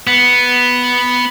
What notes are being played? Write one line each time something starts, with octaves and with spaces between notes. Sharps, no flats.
B3